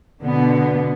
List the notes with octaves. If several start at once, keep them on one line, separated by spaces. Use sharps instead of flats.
B2 D3 B3